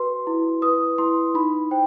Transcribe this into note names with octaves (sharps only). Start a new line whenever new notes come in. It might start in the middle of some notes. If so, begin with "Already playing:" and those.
Already playing: F#4 B4 C6
E4
B4 D#6
E4 C6
D#4 B5
C5 G5